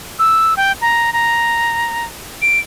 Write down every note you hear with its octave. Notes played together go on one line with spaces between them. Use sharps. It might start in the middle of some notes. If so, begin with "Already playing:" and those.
E6
G5
A#5
A#5
D7